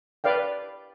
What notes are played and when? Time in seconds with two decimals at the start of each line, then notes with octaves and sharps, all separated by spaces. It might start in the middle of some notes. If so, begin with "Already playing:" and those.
0.24 B4 D5 F5 G5